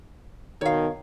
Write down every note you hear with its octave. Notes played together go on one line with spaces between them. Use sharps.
B2 D#3 C#5 F5